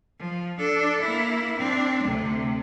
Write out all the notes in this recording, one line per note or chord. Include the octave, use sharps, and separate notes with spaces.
F3
D4 A4
A#3 E4
C4 D4
D2 C3